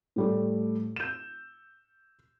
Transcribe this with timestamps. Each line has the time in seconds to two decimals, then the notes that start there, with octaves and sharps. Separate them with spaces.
0.16 A2 G3 A3
0.96 G6 E7